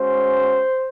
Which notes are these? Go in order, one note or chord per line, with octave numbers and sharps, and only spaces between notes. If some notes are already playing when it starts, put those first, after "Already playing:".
Already playing: G#3 C#4 F#4 C5